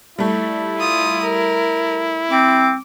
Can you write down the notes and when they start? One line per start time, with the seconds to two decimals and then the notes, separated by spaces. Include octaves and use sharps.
0.18 G3 A3 E4
0.78 F4 D#6
1.22 A#4
2.31 C4 D6